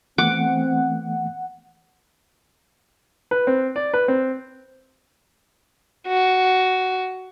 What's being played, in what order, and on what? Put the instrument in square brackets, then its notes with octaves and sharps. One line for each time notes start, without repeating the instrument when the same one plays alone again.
[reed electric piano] E3 A3 B3 [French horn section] C4 [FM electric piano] F#5 [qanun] D6
[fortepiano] B4
C4
D5
B4
C4
[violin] F#4